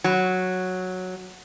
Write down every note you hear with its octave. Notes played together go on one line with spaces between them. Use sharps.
F#3